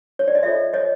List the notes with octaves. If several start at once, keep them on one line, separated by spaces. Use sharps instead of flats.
C#5
D5
D#5
F4 A4 C#5 D5 E5
C#5 D#5